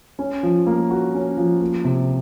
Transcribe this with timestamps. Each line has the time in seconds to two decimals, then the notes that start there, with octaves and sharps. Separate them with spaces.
0.19 C#4
0.43 F3
0.67 A#3
0.90 F#4
1.14 C#4
1.37 F3
1.61 A#3
1.84 C3